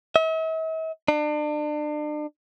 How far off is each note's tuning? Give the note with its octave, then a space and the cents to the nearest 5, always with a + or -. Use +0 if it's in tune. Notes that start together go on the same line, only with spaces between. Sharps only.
E5 -45
D4 +35